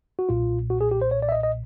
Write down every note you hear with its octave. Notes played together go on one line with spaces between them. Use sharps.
F#4
B1 A#2 F4
F#4
G#4
G4
C5
C#5
D5
E5
D#5
D#5